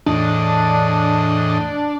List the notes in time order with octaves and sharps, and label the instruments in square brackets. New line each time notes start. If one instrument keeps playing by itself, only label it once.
[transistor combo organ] E2 A2 D#5 [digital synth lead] D4